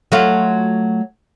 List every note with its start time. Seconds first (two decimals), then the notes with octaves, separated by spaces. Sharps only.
0.12 F#3 A3 F4